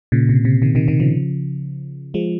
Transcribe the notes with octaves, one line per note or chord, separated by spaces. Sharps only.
A#2 C#3
C3
C3
C3 D#3
C3 D#3
C3 D#3
C#3 F3
F3 G#3